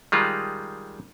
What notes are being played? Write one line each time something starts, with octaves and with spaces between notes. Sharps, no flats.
D#3 G3 G#3 F4